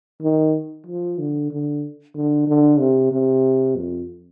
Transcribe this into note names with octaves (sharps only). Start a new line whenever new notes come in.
D#3
F3
D3
D3
D3
D3
C3
C3
F2